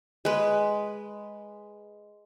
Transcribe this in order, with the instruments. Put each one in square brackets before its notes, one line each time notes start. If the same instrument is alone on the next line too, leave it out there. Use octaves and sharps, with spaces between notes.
[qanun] G#3 B4